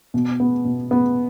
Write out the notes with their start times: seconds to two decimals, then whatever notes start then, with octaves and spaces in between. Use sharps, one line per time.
0.14 B2
0.40 B3
0.65 B2
0.91 B3